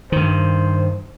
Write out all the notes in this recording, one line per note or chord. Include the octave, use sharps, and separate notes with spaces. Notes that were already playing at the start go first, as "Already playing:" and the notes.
G2 D#3 C5